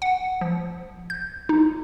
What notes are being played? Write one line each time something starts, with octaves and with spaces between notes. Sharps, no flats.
F#5
F3
G6
D#4